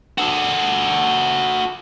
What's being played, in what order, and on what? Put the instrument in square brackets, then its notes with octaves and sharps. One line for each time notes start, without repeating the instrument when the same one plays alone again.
[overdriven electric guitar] F#4 A4